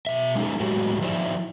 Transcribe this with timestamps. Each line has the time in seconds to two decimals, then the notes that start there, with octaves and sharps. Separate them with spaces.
0.07 B2 E5
0.35 G#3 C#4 D#4 E4 G4 A4
0.60 A2 G#3 F#4 G4
1.01 F3 D#4 E4 C5 D5 E5